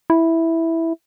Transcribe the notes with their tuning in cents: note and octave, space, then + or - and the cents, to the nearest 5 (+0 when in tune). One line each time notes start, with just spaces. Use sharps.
E4 -5